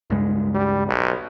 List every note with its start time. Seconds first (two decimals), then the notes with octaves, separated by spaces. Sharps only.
0.10 C#2 G2 G#3
0.55 G3
0.87 B1